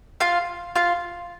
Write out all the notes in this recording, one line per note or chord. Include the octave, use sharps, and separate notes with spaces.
F4 F5
F4 F5